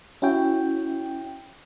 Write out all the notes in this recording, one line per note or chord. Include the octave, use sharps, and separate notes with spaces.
C#4 E4 F#4 G5